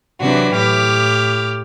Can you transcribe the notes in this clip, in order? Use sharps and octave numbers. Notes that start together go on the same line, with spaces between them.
C3 E3 F#3 C4 D4 F#4
A2 G4 D6 F6